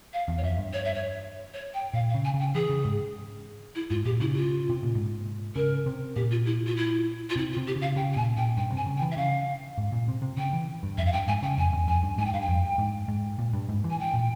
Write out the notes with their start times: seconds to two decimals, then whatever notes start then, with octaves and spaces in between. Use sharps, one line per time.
0.13 F5
0.28 E2
0.38 C#5
0.43 F2 E5
0.58 G2
0.73 C#5
0.84 E5
0.94 C#5
1.54 C#5
1.74 G5
1.94 A#2 F5
2.09 F5
2.14 C#3
2.24 G#5
2.34 C#3
2.39 G5
2.54 E3 G#4
2.70 C#3
2.85 G#2
3.75 E4
3.90 G#2 F4
4.05 A#2 G4
4.20 C#3 E4
4.35 F4
4.70 C3
4.83 A#2
4.95 G#2
5.55 C#3 A#4
5.86 C3
6.16 A#2 G4
6.31 F4
6.46 E4
6.66 F4
6.76 E4
7.30 F4
7.36 C3 E4
7.52 F4
7.57 C3
7.67 G4
7.76 C#3
7.81 F5
7.96 C#3 G5
8.13 G5
8.16 A#2 G#5
8.37 A#2 G5
8.57 G2 G5
8.72 C3 G#5
8.86 C#3
8.97 G5
9.02 E3
9.11 E5
9.17 C#3 F5
9.78 G#2
9.92 A#2
10.08 C3
10.22 C3
10.37 C#3 G5
10.53 E3
10.83 G2
10.98 F2 E5
11.06 F5
11.12 G2 G5
11.28 G#2 G#5
11.43 C#3 G5
11.58 F2 G#5
11.73 E2
11.87 F2 G#5
12.03 G2
12.18 G#2 G#5
12.25 G5
12.33 G2 F5
12.41 G5
12.48 F2
12.78 G#2
13.08 G#2
13.39 A#2
13.53 G2
13.69 G#2
13.84 E3
13.90 G#5
13.99 G5
14.14 A#2